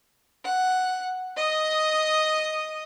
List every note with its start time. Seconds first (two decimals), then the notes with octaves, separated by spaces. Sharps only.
0.44 F#5
1.36 D#5 D#6